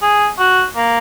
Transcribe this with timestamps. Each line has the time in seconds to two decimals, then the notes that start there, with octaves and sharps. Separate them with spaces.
0.02 G#4
0.38 F#4
0.76 A#3